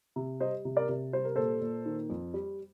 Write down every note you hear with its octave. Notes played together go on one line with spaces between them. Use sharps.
C3
G3 C5 D#5
C3
A#4 D5
C3
G3 C5
A#4
A#2 A4 C5
A#2
D#3
F2
G3